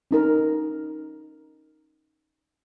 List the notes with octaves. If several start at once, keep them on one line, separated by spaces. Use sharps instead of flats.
C#4 D#4 A#4